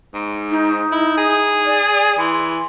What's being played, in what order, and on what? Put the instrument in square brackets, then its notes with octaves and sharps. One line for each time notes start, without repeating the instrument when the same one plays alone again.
[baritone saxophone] G#2
[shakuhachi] D#4
[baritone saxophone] E4
G#4
[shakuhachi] D5
[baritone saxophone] E3 [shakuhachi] C6